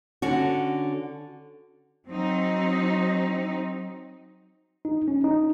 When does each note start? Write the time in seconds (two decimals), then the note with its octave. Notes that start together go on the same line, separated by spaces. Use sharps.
0.22 D3 C#4 F#4
2.08 F#3 C4 D#4
4.85 D#4
5.08 C#4
5.24 D#4